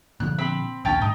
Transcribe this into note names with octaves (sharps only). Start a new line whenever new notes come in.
A#2 D3 F3 F#6
C4 B5
A#1 D#2 C#4 D4 G5 A5
G#2 D#4